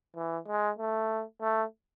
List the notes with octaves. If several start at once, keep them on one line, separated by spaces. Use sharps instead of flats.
E3
G#3
A3
A3